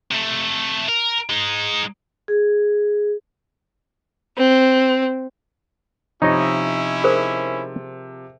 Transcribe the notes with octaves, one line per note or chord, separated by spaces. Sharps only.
C3 A3
A#4
G#3 D#4
G#4
C4
C3 F3 C#4 D#4 E4 C#5 D#5
G#4 A#4 C5